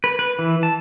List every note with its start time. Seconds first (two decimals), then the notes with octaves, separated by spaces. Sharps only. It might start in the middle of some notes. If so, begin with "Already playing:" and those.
0.04 B4
0.19 B4
0.39 E3
0.63 A5